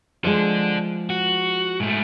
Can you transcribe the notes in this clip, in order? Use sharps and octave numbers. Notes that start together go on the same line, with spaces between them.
F3 G#3 A4 D5
F#4
G#2 A3